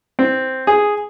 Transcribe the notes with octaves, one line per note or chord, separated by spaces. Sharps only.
C4
G#4